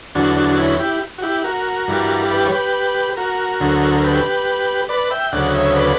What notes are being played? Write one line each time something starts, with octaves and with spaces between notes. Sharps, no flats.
E2 D3 F#3 D4 F#4
D4 F#4
F#4
C#4 E4
E4 G4
F#4
E4 G4
F#4 A#4
G2 E3 G3
G4 B4
C#5
G4 B4
F#4 A#4
D2 D3 F#3
A#4
G4 B4
B4 D5
E5 G5
D2 C#3 F#3 D5 F#5
C#5 E5
B4 D5